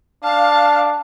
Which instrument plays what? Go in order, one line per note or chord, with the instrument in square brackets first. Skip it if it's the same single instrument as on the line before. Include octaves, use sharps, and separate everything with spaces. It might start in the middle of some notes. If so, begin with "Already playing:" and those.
[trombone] D4 [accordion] F5 [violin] A5